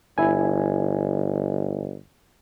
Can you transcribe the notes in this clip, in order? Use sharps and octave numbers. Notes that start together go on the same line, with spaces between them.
G1 E4 G#5